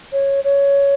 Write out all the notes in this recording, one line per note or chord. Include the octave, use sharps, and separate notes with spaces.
C#5
C#5